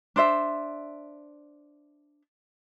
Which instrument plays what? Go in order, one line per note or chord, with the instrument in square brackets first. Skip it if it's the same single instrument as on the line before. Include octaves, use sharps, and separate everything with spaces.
[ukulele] D4 C5 E5